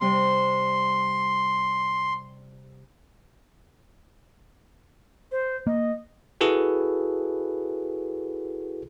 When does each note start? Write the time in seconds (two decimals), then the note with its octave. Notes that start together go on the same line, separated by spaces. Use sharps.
0.01 C3 G3 C4 C6
5.32 C5
5.67 A#3 D#5
6.41 E4 F#4 G#4 A4 B4